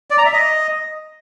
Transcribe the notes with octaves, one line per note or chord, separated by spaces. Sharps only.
D5
A#5
E5
D#5